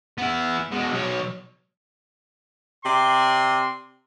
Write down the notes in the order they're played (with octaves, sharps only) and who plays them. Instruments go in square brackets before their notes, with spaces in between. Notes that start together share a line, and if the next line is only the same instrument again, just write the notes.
[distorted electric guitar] B3 E4
B2 G#3
B1 C#5
[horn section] C3 D5 C6